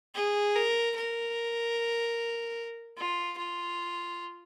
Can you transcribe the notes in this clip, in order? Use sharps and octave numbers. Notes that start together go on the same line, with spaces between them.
G#4
A#4
A#4
F4
F4